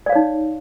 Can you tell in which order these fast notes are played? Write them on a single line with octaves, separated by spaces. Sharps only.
D5 F5 C#5 D#4